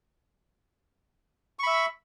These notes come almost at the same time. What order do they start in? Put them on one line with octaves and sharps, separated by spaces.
C#6 B5 E5